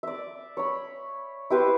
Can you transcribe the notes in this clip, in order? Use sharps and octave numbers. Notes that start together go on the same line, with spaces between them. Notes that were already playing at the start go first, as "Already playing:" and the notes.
D5 E5
C#5 B5
E4 G4 B4 C5